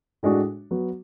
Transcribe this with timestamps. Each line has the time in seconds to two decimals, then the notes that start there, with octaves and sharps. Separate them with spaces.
0.23 A2 G#3 D4 F#4
0.71 F#3 B3 F#4